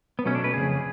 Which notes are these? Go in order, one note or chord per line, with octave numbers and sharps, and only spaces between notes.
B3
B2 F#3 A3 C#4
D4
B4
F2 C#3 G#4